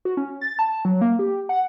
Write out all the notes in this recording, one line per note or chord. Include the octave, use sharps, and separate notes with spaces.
F#4
C#4
A6
A5
F#3
A#3
G4
F#5